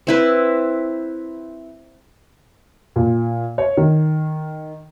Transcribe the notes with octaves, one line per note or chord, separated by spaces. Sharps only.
C4 E4 B4
A#2
C#5
D#3